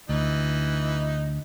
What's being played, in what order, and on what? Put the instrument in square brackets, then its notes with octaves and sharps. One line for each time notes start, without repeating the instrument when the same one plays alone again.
[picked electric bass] D2 [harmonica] E3 D#4